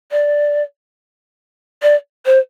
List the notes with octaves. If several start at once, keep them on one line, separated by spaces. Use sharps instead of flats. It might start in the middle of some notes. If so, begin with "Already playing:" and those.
D5
D5
C5